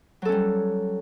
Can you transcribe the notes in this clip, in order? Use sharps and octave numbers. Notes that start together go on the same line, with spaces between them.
F#3 G3 C#4 A4